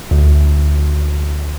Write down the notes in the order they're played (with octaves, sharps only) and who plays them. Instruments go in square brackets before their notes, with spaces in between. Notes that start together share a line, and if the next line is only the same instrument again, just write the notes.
[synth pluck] D2